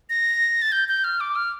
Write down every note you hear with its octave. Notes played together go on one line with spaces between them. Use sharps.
A#6
A6
G6
G6
F6
D6
F6